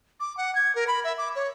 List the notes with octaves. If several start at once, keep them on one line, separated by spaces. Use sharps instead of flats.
D6
F#5
G#6
A#4
B5
E5
D6
C#5